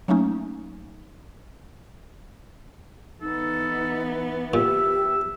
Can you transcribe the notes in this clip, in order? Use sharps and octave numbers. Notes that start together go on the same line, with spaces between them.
F#3 A3 A#3 C#4 D#4
E3 B3 D#4 A4
A#2 G4 E5